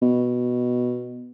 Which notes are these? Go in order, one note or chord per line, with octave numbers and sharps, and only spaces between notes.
B2